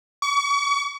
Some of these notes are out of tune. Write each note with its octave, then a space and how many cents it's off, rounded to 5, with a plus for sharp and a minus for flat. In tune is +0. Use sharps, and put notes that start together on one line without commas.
C#6 +40